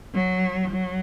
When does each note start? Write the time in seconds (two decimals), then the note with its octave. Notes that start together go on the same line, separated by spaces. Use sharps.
0.14 F#3
0.70 F#3